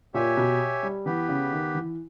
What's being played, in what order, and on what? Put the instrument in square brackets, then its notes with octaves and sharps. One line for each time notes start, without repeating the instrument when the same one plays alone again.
[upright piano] A#2 [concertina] G4 C#5 E5 G#5
[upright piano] B2
G3
[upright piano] E3 [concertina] B3 G4 B4
[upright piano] C#3
D#3
E3